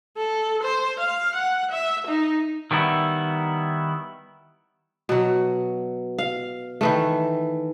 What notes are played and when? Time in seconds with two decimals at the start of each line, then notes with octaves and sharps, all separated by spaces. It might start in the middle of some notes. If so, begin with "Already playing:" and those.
0.17 A4
0.63 C5
1.00 F5
1.35 F#5
1.71 E5
2.07 D#4
2.71 D#3 G3 B3 E4
5.09 B2 F#3
6.18 F5
6.81 D#3 E3 A3